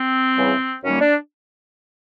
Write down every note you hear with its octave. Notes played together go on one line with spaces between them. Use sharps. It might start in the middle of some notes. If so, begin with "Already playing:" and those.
Already playing: C4
E2 C#3 E3 G3
F#2 D#3 G3 A#3 C#4
D4